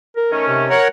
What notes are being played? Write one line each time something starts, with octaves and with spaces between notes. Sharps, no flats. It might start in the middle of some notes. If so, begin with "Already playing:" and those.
A#4
D#3 A3 C#4
C3
A#4 C#5 F#5